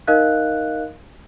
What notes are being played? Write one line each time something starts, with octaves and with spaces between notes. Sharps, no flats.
D#4 A#4 D#5 F5 F#6